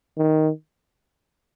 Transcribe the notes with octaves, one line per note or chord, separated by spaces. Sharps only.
D#3